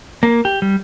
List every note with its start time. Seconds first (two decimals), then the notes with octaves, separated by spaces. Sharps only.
0.23 A#3
0.45 G4
0.62 G3